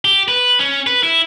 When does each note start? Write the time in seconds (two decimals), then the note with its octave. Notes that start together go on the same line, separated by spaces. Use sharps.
0.05 G4
0.28 B4
0.59 C#4
0.87 B4
1.03 E4